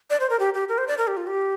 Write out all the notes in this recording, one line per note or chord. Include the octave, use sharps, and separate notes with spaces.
D5
C5
A#4
G4
G4
A#4
C5
D5
A#4
G4
F4
G4